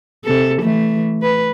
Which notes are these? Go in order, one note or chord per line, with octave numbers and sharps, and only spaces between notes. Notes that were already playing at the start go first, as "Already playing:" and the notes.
C3 A4
E3 A3
B4